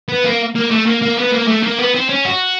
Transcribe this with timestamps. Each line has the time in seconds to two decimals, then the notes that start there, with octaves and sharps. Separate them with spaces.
0.09 B3
0.25 A#3
0.55 A#3
0.70 A3
0.86 A#3
1.02 A#3
1.17 B3
1.32 A#3
1.47 A3
1.63 A#3
1.79 B3
1.95 C4
2.09 C#4
2.25 F#4